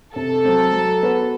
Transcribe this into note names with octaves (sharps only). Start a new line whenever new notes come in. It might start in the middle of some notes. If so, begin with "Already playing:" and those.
C3 A4
F#3 C4
F#3
B3 F#4 B4